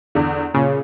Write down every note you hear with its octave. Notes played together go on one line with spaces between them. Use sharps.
E2 D3
A#2 C#3